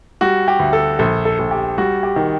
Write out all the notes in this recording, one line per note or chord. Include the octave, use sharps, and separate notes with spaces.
G3 F#4
G4
D2
A4
A#1 A4
A4
A#1
G4
G3 F#4
G4
D#3